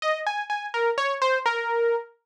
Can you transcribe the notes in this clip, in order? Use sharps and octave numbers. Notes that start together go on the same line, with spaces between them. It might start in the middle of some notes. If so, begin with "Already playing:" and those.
D#5
G#5
G#5
A#4
C#5
C5
A#4